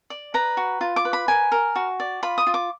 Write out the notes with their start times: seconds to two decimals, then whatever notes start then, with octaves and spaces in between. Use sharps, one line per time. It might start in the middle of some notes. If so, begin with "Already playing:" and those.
0.10 D5
0.34 B4 A#5
0.57 F#4
0.81 F4
0.96 D6
1.05 B4
1.13 B5
1.28 A#4 G#5
1.52 A#4
1.76 F#4
2.00 D5
2.23 F4 B5
2.38 D#6
2.47 F4
2.54 D6